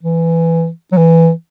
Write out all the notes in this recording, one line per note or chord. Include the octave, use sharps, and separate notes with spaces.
E3
F#3
E3